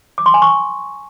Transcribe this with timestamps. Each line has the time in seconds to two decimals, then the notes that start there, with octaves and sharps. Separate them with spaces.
0.18 D6
0.26 C6
0.34 G#5
0.42 C#6